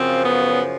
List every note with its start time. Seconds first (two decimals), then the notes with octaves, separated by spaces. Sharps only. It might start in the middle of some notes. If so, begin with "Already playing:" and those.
Already playing: F#2 C#3 F3 C4
0.24 B3